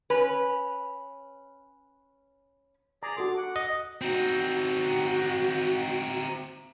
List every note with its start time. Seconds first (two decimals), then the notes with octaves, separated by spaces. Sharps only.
0.10 C#4 B4
3.03 G#4 D5 A#5
3.17 F#4 A4 C6 D6
3.38 F#5
3.56 D#5
4.01 C4 D#4 F#4